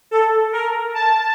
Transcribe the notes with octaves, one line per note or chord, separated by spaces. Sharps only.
A4
A#4
A5